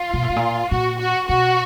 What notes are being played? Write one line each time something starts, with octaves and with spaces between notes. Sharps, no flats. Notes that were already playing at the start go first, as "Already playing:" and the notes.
Already playing: F4
B2
A#2
A2
A#2
A#2 F#4
F#4
B2 F#4